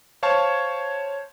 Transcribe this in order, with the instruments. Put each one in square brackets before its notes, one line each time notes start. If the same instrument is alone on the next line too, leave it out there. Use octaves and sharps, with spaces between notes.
[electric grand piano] C5 C#5 F5 A5 C#6